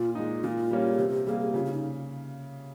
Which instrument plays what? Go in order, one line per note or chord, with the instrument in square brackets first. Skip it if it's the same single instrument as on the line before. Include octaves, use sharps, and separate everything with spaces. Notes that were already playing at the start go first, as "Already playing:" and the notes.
Already playing: [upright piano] A#2 [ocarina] F4
[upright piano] G#3 D#4
[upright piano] A#2 [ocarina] F4
[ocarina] F4
[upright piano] G3 A#3 C#4
[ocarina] D#4
F4
G#4
[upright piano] C3 [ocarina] G4
[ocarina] F4
G4
[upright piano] G3 A#3 [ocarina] G#4
[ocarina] G#4
[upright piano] C#3 [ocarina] F4
[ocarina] F4
D#4